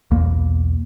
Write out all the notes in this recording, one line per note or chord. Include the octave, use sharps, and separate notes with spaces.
B1 E2 A#3